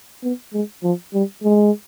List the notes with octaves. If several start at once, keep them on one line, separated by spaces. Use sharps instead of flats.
B3
G#3
F3
G3
G#3